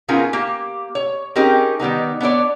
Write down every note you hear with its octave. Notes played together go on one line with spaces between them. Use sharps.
B3 C#4 D#4 F4 G#4 A#4
A#3 G4
C#5
C4 C#4 D#4 G4 G#4 A#4
D#3 G3 B3 D#4
B3 D4 C#5 D5